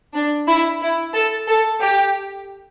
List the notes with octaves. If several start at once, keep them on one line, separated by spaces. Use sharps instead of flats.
D4
E4
E4
A4
A4
G4